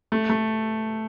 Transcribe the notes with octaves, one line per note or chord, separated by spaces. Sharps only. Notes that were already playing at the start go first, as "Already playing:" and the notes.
A3
A3